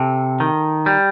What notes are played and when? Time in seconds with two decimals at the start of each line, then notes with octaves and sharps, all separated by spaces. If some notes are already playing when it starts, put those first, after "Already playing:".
Already playing: C3 A4
0.40 D#3
0.86 G3